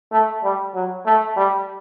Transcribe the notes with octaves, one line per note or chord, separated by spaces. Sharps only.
A3
G3
F#3
A3
G3